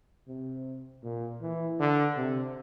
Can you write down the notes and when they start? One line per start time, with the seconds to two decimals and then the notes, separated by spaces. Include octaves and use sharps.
0.28 C3
1.03 A#2
1.41 E3
1.79 D3
2.17 C3